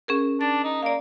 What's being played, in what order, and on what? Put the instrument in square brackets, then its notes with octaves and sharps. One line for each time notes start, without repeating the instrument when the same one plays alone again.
[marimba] C#4 G#4 A#4
[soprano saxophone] D4 [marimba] A6
[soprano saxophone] D#4
[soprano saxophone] A#3 [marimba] D5 F5